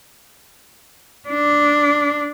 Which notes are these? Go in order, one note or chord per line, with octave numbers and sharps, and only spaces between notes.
D4